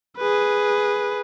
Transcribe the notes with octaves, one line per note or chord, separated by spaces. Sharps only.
G#4 B4